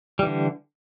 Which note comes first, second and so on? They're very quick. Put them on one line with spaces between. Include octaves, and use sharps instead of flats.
G3 E3 D3